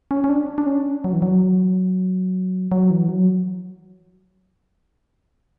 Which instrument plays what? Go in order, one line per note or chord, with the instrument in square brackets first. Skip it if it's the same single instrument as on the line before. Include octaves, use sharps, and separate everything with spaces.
[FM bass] C#4
C#4
D4
D4
C#4
F#3
E3
F#3
F#3
E3
F#3